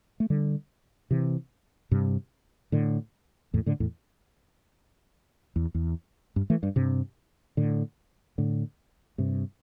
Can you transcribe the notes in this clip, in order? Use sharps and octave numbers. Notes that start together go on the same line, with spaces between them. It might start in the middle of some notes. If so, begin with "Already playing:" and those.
A3
D3 G3
C3 E3
G2 C3
A2 D3
E2 A2
A2 D3
E2 A2
E2
E2
G2
E3 A3
G2
G2 C3
A2 D3
A2 D3
G2 C3